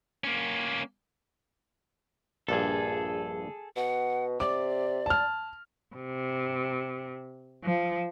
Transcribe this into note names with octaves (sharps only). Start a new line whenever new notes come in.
A#3 C#4
A#1 G2 G#4 A4
B2 F#5
C3 D5 D6
A5 F6
C3
F3